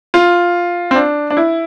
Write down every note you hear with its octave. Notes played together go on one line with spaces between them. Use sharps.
F4
C4
D4
D4
E4